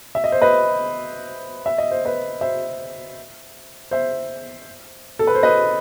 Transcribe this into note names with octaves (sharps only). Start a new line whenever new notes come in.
E5
D#5
C5
B4 D#5
E5
D#5
C5
B4 D#5
C5 E5
C5 E5
A4
B4
C5
B4 D#5